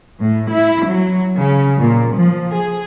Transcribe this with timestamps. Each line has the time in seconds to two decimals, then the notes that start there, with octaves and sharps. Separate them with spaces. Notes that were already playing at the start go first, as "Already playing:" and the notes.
0.21 A2
0.51 E4
0.87 F#3
1.39 C#3
1.80 A#2
2.15 F3
2.54 G#4